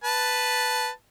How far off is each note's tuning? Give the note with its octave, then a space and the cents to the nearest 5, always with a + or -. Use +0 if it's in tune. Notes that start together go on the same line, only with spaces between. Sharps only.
B4 +0 A5 +0